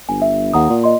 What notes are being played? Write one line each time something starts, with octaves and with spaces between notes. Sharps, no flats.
G1 G#5
E5
D#2 F#5 A#5 D#6
A#2
D#5 C6